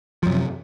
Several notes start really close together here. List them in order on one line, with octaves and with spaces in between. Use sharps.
F3 F#2 C3